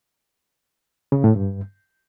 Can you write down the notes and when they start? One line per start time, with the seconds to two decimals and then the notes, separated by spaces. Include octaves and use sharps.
1.12 C#3
1.24 A2
1.36 G2